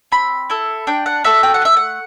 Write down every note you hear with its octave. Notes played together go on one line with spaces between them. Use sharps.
C4 B5
E4 A4
D4 G5
F#5
F#4 A4 E5
G5
F#5
A3 E5
F#5